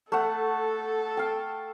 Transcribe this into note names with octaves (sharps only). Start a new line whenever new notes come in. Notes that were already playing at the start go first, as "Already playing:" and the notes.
A3 A4 F#5
F5 G5